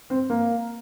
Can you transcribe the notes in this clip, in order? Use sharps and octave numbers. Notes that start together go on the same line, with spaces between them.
C4
A#3